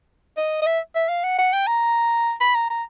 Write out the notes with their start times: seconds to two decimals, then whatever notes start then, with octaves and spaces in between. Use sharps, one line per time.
0.37 D#5
0.62 D#5
0.66 E5
0.95 E5
1.09 F5
1.24 F#5
1.38 F#5
1.53 G5
1.67 A#5
2.40 B5
2.55 A#5
2.70 A#5